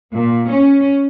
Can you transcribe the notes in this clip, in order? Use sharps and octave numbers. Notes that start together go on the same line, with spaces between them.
A#2
C#4